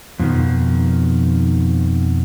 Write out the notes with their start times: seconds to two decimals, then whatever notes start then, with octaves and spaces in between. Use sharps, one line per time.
0.19 F2 B2 D#3 F3